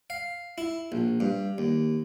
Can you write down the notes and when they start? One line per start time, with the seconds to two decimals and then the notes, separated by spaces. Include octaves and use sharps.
0.10 F5
0.58 E4
0.92 A#1
1.20 G2
1.58 D#2